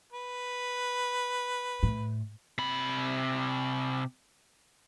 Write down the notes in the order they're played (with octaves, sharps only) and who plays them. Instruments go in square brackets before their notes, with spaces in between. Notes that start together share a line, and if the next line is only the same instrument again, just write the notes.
[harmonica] B4
[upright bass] A2
[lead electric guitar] C3 B5